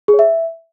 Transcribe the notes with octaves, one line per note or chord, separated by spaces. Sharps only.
G#4
C#5
E5